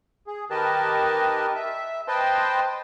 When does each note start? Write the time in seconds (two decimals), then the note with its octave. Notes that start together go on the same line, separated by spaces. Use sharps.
0.27 G#4
0.50 D#3 G4 A#4 B4 D#5 A5
1.55 E5
2.08 B4 C5 D#5 G5 A5 C6